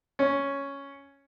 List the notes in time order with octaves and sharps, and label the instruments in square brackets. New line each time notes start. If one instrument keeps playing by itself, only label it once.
[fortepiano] C#4